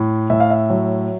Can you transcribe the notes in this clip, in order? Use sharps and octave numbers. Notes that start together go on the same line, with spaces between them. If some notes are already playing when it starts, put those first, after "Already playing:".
Already playing: A2
A2 E5
F5
E5
F#3